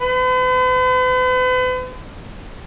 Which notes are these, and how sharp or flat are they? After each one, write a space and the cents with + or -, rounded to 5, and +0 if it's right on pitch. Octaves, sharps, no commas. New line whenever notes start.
B4 +45